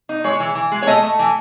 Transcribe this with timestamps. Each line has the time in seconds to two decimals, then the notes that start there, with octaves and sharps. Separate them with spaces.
0.09 D#4
0.24 G#3 C#5
0.40 E3
0.55 E3
0.72 G#3
0.82 C#5
0.87 A3 D#5
1.02 A3
1.19 E3